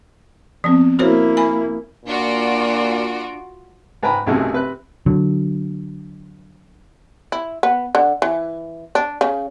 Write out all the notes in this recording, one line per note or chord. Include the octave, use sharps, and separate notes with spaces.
F3 B3 C4
A#3 E4 F#4 C5 C#5
G#5 B5
A#2 D4 F4 F#4 D7
G#2 B4 G5 A#5 B5
B1 F#2 C3 F#3 G#3 A3
C3 B4 F#6
D3 F#3
E4
B3
D3
E3
D4
C#3